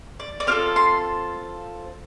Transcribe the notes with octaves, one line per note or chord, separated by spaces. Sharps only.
D5
D5
C4 F4 A4 F5
C6